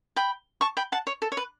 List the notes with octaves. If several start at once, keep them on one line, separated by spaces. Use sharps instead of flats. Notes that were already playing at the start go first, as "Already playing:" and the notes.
G5 B5
A5 C#6
G5 B5
F#5 A5
C#5
A4
C#5
B4